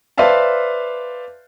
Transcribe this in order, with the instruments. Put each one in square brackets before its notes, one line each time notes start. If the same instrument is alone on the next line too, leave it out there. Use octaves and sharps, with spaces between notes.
[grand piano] B4 C5 D5 E5 F5 A5